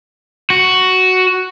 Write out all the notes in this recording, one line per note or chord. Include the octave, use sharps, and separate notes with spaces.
F#4